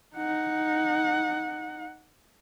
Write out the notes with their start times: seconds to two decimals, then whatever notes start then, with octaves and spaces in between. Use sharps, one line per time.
0.16 D#4 F#5